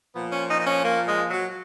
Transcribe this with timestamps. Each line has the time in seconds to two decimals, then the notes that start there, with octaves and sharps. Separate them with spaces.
0.14 A#2 F3 B3
0.32 C#4
0.50 D#4
0.60 D#4
0.66 C#4
0.84 A#3
1.07 G#3
1.30 F#3